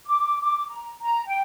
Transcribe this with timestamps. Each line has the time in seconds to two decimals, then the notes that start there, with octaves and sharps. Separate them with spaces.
0.06 D6
0.40 D6
0.69 A#5
1.01 A#5
1.26 G5